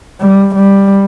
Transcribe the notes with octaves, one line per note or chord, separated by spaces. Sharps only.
G3
G3